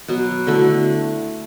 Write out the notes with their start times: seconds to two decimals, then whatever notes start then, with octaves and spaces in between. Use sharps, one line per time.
0.08 B2 F#3 B3 F#4
0.47 D3 A3 E4